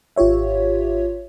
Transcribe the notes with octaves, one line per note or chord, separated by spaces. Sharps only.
G#1 F4 G4 C#5 E5